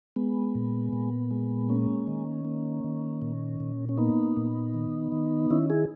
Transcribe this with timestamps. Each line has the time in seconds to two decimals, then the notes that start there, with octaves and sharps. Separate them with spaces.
0.16 G#3 B3
0.55 A#2
0.93 A#2
1.31 G#3
1.69 A#3 C#4
2.07 D#3
2.45 A#3
2.84 D#3
3.22 A#2
3.60 A#2
3.89 C#4
3.97 A#3 B3 D#4
4.37 A#2
4.74 D#3
5.12 D#3
5.50 D#3 C#4 E4
5.70 E4 G#4